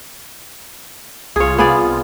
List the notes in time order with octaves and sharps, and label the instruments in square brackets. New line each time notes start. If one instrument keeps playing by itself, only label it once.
[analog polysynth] C2 F4 [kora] G#4 C#5
[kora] B3 G#4 D5